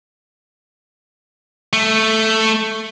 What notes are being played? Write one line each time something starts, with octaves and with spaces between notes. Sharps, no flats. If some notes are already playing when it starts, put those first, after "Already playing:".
A3